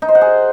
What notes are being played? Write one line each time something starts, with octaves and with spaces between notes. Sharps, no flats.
D#4
C5
F#5
G#4